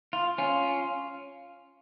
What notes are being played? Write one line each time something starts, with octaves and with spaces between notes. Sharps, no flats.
F4
C#4 F4